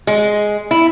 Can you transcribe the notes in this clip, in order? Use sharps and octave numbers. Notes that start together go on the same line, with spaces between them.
G#3
E4